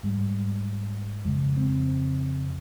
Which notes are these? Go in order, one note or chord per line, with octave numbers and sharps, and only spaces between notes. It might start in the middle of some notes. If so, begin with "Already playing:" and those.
G#2 G3
F2 C#3 G#3
C4